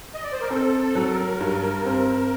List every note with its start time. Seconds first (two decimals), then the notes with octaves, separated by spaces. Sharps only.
0.15 D#5
0.23 D5
0.32 C5
0.41 A#4
0.50 C4 A4
0.80 A4
0.95 F#3
1.11 A#4
1.40 G2
1.85 C4